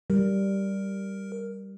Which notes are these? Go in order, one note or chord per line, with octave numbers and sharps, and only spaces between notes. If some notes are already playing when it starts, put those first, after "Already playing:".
G3 A#4